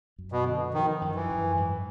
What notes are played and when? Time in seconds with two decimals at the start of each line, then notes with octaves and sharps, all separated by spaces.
0.18 F#2
0.32 B2
0.46 D3
0.74 D#3 F3
1.02 F#2
1.15 E3
1.30 F#2
1.57 G#2